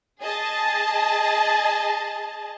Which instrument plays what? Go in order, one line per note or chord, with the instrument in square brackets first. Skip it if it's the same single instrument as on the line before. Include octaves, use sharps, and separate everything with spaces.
[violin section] G#4 D#5 A5